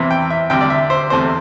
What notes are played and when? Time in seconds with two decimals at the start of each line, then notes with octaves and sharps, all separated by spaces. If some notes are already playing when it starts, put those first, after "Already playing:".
Already playing: E2 C3 E3 C4 E5
0.11 G5
0.30 E5
0.50 D2 C3 G3 G5
0.61 D5
0.70 E5
0.90 C5
1.10 E2 C3 A3 C4 C5